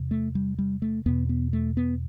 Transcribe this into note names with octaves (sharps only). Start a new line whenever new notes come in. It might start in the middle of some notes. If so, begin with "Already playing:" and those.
Already playing: E2 C3
A3
G3
G3
A3
E2 B2 B3
B3
A3
B3